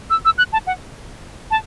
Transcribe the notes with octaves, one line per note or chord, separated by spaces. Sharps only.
E6
E6
F#6
A5
F#5
A5